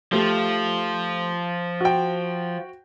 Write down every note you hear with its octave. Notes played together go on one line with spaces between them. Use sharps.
F3 A3 G4
F#4 G5